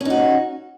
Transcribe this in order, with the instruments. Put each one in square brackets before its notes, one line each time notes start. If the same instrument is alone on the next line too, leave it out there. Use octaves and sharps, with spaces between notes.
[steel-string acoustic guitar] C#4
D#4
F#4